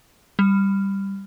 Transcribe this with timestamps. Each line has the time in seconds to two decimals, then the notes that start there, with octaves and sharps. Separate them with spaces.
0.39 G3